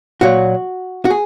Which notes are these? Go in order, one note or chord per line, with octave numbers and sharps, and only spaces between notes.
A#2 F#3 F#4
F#4
G#4